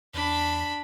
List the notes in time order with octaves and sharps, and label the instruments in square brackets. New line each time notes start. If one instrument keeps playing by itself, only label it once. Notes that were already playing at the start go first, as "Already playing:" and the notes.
[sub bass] E2 [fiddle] D4 B5